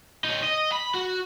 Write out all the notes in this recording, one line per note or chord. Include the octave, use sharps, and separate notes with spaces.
D#4 C#5
D#5
B5
F#4